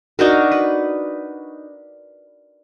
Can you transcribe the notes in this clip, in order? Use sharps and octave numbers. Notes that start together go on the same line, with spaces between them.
D4 D#4 F#4 A#4
B4